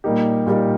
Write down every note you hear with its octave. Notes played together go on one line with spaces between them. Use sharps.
A#2 G3 A#3 D#4 G4
A#2 G3 A#3 D#4 G4